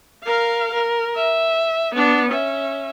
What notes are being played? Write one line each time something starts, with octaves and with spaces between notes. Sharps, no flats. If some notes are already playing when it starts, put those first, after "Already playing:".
A#4 F5
A#4
E5
B3 D4
C#4 E5